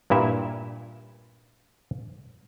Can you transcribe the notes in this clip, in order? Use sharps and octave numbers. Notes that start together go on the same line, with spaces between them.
G2 A#2 E4 E5